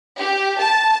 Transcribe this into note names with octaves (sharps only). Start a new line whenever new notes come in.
G4
A5